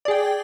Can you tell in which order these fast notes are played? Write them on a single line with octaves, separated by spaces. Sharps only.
D5 G#4 G5